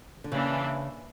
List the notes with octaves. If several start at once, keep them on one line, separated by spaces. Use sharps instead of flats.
D3
C#3 E3 A#3 D4